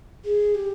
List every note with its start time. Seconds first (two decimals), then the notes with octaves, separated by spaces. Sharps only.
0.25 G#4
0.55 G4